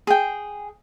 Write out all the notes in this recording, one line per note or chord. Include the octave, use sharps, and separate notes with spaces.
G#4 G5